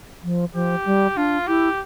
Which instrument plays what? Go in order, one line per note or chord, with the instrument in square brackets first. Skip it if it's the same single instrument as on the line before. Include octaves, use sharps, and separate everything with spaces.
[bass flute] F3
[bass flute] F3 [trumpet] G4
[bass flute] G3
[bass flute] D4 [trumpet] F4
[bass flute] E4 [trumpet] G4